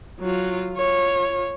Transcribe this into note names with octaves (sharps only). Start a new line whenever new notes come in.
F#3 F4
F4 C#5